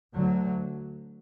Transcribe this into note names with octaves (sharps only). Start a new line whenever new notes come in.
D2 D3 F#3